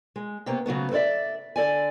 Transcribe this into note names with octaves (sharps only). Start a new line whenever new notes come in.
G#3
C3 A#3 B3 C#4
C#3 F#3 A3 B3
A4 B4 C#5 D5 E5
D3 A4 D5 G#5